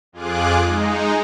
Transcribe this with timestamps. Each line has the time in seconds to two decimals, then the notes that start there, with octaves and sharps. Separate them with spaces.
0.13 F2 F4 G#4 D6 F#6
0.62 G#3 D#4